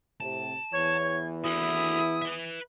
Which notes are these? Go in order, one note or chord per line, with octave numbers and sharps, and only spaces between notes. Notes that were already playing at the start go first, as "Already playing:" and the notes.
A2 C3 A5
E2 E3 C#5 G#6
E4 F#4 A4 D#6
B4 E5